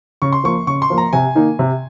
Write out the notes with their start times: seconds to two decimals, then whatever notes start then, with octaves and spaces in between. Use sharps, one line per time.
0.22 C#3 C#6
0.32 C6
0.44 F3 A#3 C#6
0.67 C#3 C#6
0.82 C6
0.90 F3 A#3
0.98 A#5
1.13 C3 G#5
1.35 D#3 A#3 D#4
1.59 C3